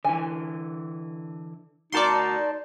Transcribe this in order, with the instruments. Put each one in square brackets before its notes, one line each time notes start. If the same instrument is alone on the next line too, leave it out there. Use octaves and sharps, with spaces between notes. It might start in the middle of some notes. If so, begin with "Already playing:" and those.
[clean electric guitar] D3 E3 [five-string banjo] G#5
[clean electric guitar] D2 F#4 A#4 [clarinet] D#4 [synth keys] D5 A5 C6